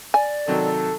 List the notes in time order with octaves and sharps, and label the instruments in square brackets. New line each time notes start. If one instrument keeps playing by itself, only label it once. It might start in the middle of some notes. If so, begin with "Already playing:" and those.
[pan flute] D5 [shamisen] G#5
[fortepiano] C3 D#3 F#3 [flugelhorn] A4